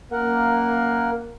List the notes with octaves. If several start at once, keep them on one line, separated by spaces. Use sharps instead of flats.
F#2 A#3 A#4 F#5